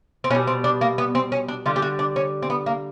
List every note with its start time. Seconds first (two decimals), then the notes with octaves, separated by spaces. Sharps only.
0.24 C4
0.30 B2 C#4
0.35 G3
0.47 C4
0.64 D4
0.81 A#3
0.98 B3
1.15 C4
1.32 C#4
1.48 D4
1.66 D3 G3 F4
1.76 G4
1.82 F#4
1.99 D4
2.16 C#4
2.42 C4
2.50 B3
2.66 A#3